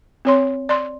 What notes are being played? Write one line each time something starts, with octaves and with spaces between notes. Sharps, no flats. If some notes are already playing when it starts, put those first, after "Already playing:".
C4 C#5 C6
D5 C6